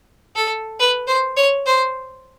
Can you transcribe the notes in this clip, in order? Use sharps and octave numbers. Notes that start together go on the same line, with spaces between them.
A4
B4
C5
C#5
C5